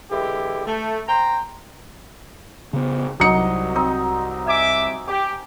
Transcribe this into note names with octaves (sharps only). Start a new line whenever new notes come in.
D3 E3 G#3 E4 G4
A3
C5 G5 A#5
C#3 B3
C2 F#3 D#4 D#5 C#7
C4 D#4
E5 G#5 D6
G4 D6